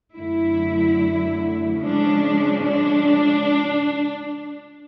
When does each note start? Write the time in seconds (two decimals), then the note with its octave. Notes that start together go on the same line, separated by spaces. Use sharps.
0.18 F#2 D3 F#3 A3 E4
1.82 C#3 F3 G#3 C#4 D4
2.65 D4